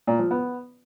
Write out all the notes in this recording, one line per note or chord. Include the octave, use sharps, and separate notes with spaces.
A#2
F3
B3